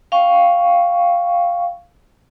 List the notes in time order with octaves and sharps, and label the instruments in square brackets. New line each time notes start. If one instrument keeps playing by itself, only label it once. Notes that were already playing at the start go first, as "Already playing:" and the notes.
[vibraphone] F5 G5 C#6